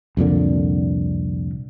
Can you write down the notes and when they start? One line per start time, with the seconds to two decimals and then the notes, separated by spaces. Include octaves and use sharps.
0.17 C2 F2 A#2 D3